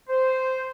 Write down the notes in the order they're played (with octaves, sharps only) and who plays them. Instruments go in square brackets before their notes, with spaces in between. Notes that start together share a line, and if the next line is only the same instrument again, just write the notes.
[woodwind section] C5